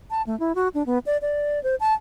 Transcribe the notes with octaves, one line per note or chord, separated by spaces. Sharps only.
A5
A3
E4
F#4
D4
B3
D5
D5
C5
A5